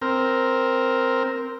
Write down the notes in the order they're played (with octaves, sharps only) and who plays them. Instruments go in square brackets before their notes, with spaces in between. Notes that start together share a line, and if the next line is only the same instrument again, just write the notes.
[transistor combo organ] C4 A#4